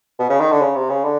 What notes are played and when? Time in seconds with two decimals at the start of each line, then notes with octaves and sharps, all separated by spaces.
0.19 B2
0.30 C#3
0.40 D#3
0.51 D3
0.62 C#3
0.75 C3
0.89 C#3
1.04 D3